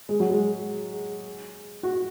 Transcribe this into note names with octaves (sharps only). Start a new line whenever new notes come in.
G#3
F#3
G#3
F#4